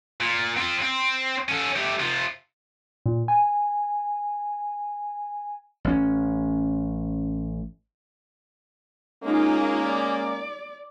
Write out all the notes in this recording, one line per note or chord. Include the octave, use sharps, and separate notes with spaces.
A#2
C4 F4
C4
C#4 A4
A3 G4
C3 F4
A#2
G#5
A1 C#4
G#3 A#3 C#4 D#4 F4
D5